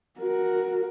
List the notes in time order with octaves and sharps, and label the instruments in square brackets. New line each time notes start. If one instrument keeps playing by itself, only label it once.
[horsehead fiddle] F#4 A#4